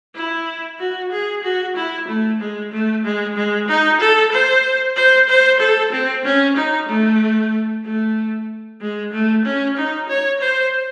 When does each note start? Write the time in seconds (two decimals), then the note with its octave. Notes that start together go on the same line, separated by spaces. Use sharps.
0.15 E4
0.79 F#4
1.12 G#4
1.43 F#4
1.76 E4
2.08 A3
2.40 G#3
2.72 A3
3.04 G#3
3.36 G#3
3.68 D#4
4.00 A4
4.32 C5
4.96 C5
5.29 C5
5.60 A4
5.92 C4
6.25 C#4
6.56 D#4
6.88 A3
7.85 A3
8.81 G#3
9.12 A3
9.45 C#4
9.77 D#4
10.08 C#5
10.40 C5